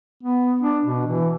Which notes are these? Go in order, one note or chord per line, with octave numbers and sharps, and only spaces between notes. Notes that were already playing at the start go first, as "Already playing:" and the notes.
B3
D4
B2
E3